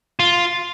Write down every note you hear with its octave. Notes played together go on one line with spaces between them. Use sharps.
F4